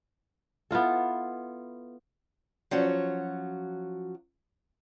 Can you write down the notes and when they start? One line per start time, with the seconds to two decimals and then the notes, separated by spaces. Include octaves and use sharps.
0.71 B3 E4 F4 A4
2.71 F3 F#3 C#4 F#4